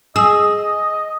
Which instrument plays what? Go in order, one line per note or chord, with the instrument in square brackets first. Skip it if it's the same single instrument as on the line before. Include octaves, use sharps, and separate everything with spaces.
[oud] G#4 [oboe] D#5 [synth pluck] E6